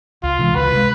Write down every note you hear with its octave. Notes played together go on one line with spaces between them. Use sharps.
C#2 F4
C3 E3 G#3
C#2 B4
C3 E3 G#3